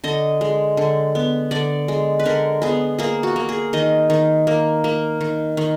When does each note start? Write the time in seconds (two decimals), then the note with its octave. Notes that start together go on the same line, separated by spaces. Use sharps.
0.04 D3 D#5
0.41 G#3
0.77 D3
1.15 B3
1.51 D3 D5
1.88 G#3
2.19 B4
2.26 D3 A#4
2.62 B3 G#4
2.99 A#3 G#4
3.23 F#4
3.36 A#3
3.49 G#4
3.73 D#3 D#5
4.10 D#3
4.47 A#3
4.84 A#3
5.21 D#3
5.57 D#3